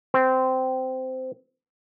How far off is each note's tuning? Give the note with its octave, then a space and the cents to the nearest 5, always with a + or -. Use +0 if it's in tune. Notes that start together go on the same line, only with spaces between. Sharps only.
C4 -15